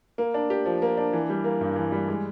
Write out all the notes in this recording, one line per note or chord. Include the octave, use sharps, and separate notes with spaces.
A#3
D4
G4
F3
A#3
D4
E3
G3
A#3
G2
E3
G3
G#3